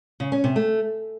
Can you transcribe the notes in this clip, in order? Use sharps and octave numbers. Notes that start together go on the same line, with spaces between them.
C#3
C#4
C3
A3